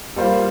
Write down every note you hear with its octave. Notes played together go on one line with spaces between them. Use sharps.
G3 A#3 F4 C5